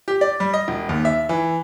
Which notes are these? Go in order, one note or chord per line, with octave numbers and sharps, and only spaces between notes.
G4
D5
G3
D#5
E1
D#2
E5
E3